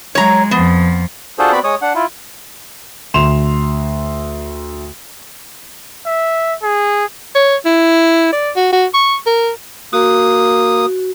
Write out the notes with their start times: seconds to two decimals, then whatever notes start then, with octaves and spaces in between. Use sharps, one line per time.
0.15 F#3 G#3 C#5 A#5
0.51 F2 F3 B3
1.39 D4 F4 F#4 G#4 A4 C5
1.52 B3 C4 F#4 D5 B5
1.64 G#3 C#5 D#6
1.82 D4 F#5
1.95 E4 F4
3.14 D2 C6 E7 F7
6.06 E5
6.63 G#4
7.35 C#5
7.65 E4
8.32 D5
8.56 F#4
8.72 F#4
8.94 C#6
9.26 A#4
9.93 A#3 F#4 D#6